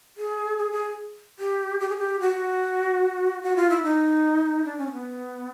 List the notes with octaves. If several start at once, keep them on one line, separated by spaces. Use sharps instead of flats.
G#4
G#4
G#4
G4
G4
G#4
G4
F#4
F#4
F4
E4
D#4
D4
C#4
C4
B3